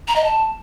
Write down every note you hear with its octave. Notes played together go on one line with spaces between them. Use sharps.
A#5
D#5
A5